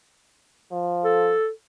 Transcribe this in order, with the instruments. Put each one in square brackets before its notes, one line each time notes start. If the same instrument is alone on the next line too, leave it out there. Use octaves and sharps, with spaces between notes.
[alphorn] F3
[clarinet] A4